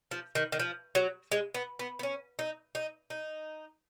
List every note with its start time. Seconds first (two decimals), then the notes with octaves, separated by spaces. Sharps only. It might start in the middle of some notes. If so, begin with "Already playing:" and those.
0.11 F3
0.35 D#3
0.52 D#3
0.60 F3
0.95 F#3
1.32 G#3
1.54 B3
1.79 B3
1.99 B3
2.03 C#4
2.39 D#4
2.75 D#4
3.10 D#4